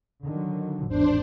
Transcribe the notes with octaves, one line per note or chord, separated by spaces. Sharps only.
D3 D#3 F#3
G#1 E2 A2 D4 C5